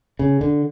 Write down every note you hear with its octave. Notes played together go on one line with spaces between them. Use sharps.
C#3
D3